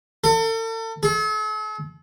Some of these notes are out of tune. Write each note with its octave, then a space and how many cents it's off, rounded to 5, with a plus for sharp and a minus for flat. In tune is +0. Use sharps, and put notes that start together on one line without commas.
A4 +40
A4 -45